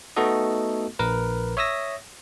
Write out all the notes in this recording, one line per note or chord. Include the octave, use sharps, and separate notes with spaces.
A3 B3 D#4 F#4 A4 D#5
A#1 A#4 B4
C#5 E5 D#6 E6 A#6